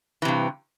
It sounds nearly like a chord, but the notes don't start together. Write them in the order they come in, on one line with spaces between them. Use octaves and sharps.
E3 C3 G2